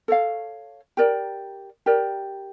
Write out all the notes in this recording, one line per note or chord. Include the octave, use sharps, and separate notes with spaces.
A4 C#5 F5
G4 A#4 D5
G4 A#4 D5